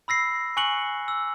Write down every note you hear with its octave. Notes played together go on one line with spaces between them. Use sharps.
B5 E6 A#6 C7
G#5 C#6 F#6 C#7 F#7
E6